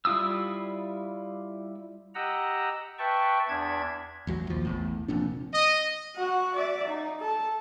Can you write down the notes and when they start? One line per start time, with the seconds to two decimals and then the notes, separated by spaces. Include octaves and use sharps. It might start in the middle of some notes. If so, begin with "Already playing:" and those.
0.05 G3 E4 F4 D#6 E6
2.15 G4 D#5 F#5 A#5 E6
2.99 B4 E5 G5 A5 C#6
3.49 E2 D4 E5 G#6
4.27 A1 E2 F#3
4.50 A#1 D#2 F3
4.65 A1 E2 A2
5.08 F1 F2 A#2 D4
5.52 D#5
6.16 F#4 F#5
6.54 D5 E5
6.87 D#4
7.20 A4